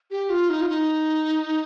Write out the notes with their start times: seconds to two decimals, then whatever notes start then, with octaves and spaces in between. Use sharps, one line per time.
0.11 G4
0.30 F4
0.50 D#4
0.61 F4
0.69 D#4